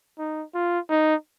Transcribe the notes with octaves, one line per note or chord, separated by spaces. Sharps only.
D#4
F4
D#4